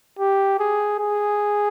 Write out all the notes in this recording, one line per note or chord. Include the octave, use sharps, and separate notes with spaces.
G4
G#4
G#4